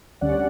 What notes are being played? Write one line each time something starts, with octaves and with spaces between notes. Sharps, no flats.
D2 D3 G3 C#4 D5 F#5